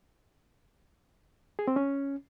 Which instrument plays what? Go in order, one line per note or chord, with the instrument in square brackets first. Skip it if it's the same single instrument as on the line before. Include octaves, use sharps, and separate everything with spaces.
[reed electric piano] G#4
C4
C#4